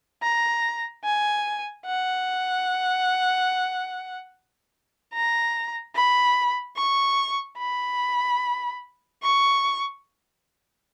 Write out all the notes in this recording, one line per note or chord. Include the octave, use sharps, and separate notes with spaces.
A#5
G#5
F#5
A#5
B5
C#6
B5
C#6